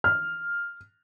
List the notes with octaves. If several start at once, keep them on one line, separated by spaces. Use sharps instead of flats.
F6